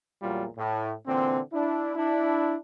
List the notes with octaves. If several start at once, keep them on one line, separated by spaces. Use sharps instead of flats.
A#1 E2 A#2 F#3 G3 F4
A2
A#2 D3 E3 C4
D4 E4
D4 E4